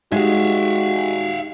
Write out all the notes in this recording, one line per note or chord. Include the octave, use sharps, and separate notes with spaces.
G#3 D#4 F#4 G4 E5 F5